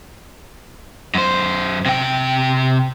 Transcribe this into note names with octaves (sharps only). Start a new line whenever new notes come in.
F#2 C5
C3 G5